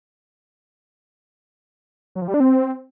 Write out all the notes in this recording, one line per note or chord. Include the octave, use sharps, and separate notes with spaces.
F#3
F3
G3
D4
C4